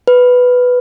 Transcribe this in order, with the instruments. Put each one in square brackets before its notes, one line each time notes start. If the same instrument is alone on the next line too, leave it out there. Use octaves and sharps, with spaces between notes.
[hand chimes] B4